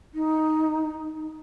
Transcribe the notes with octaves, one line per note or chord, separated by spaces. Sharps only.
D#4